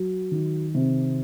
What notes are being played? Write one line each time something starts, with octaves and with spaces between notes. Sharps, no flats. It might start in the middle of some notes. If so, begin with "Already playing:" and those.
Already playing: F#3
D#3
C3